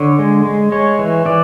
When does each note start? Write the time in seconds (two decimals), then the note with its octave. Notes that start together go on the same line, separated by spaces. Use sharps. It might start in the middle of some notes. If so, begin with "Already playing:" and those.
Already playing: D3 C#5
0.19 G#3
0.45 G#3
0.72 G#3 C#5
0.99 E3
1.26 E3 D5